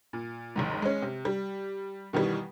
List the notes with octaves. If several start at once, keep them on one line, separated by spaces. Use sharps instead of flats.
A#2
F#1 D#2 G#2
G#3 C#4
C3
G3
B2 D#3 E3 G3